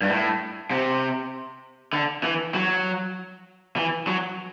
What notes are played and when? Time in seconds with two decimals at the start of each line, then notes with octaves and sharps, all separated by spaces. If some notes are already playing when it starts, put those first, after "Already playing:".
0.02 G2
0.09 A2
0.70 C3
1.93 D3
2.23 E3
2.54 F#3
3.77 E3
4.07 F#3